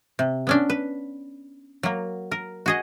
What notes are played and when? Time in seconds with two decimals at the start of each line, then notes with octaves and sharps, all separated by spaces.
0.19 C3
0.47 B3 C#4 D4
0.70 B4
1.83 F#3 A#3
2.31 A#4
2.66 F#4 G#4 D#5